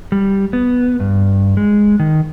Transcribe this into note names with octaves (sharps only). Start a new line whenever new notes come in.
G3
B3
G2
G#3
D#3